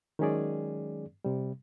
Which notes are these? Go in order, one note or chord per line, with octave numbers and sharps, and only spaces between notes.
D#3 F#3 G#3 C#4 G#4 D5
C3 G3